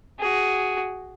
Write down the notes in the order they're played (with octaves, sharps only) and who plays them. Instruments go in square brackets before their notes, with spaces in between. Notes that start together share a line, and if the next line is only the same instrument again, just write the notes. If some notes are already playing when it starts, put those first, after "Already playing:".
[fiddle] F#4 G#4